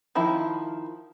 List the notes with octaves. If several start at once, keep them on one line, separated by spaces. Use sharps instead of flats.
D#3 F3 E4 B5